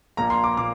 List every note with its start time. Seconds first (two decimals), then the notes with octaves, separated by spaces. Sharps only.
0.17 A#1 A#2 A#3 A#5
0.30 C6
0.44 D6
0.57 A#2 A#3 D6